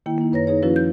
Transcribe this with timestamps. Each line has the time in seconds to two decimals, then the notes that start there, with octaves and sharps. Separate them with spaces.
0.06 D#3 A#3 E4 G5
0.18 A#3 D#4
0.32 F#2 B4 C#5 A#5 A#6
0.47 A#3 D#4 G#4 C#5
0.62 F3 C#4 E4 F#4 B4
0.76 G6